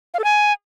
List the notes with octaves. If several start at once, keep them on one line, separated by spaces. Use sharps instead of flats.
F5
A4
G#5